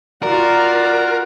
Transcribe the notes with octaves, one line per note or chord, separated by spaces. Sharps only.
F4 F#4 A#4 D5